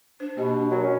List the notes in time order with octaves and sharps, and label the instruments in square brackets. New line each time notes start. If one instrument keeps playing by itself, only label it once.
[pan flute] D4 [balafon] C5
[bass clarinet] B2 [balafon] A#3 G4 D#5
[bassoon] F#3 [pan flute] A#4
[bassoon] C#4